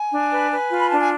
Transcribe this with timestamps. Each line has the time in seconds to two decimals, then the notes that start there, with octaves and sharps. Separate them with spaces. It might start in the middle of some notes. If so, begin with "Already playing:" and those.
Already playing: G#5
0.12 D4
0.31 B4
0.51 B4
0.70 F4
0.80 B5
0.89 D4 A5
0.99 G#5